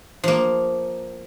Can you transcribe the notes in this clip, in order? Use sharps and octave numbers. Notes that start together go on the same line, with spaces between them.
F3 A#3